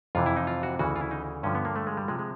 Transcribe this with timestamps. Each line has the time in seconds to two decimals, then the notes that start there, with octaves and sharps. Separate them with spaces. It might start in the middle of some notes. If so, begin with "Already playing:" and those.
0.15 F2 C3 E3 F4
0.26 E4
0.37 D#4
0.47 F4
0.63 F#4
0.79 D2 C#3 E3 F#4
0.96 F4
1.01 E4
1.11 D#4
1.43 G2 D3 F3 C#4
1.55 B3
1.65 A#3
1.76 A3
1.87 G#3
1.97 G3
2.08 C3 F3 G#3
2.19 G#3